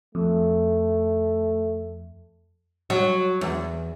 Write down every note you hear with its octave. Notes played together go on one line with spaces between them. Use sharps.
F2 A3
F#3
E2